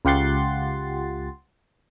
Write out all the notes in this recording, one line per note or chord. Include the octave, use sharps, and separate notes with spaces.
C#2 F4 G4 F#5 C6 A6